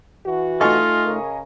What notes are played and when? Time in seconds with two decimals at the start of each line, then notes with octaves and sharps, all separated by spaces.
0.25 E3 F#4
0.61 A3 D#4 F4 A4 D#5 G#5 C#6
1.05 C#3 G#4 A#4